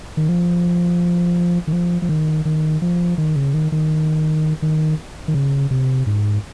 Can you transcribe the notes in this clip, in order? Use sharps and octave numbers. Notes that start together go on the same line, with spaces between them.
D#3
F3
D#3
F3
F3
D#3
D#3
F3
D#3
C#3
D#3
D#3
D#3
D#3
C#3
C3
G#2